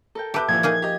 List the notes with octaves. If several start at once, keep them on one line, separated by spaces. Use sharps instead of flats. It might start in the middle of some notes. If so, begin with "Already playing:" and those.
A4 A#4 G5
G4 B4 E5 A5 D6 G6
A#2 E3 F3 G#6
A#3 D#4 G#4
G4 D#5